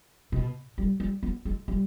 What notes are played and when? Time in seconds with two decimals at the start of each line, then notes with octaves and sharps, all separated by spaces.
0.32 B2
0.78 G3
1.00 G3
1.23 B3
1.45 G#3
1.68 G3